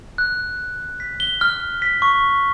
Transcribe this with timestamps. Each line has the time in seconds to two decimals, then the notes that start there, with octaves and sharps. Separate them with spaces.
0.18 F#6
1.00 B6
1.20 G7
1.41 F6
1.82 B6
2.02 C#6